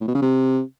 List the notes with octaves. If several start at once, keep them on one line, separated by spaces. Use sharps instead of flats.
A2
B2
C#3
C3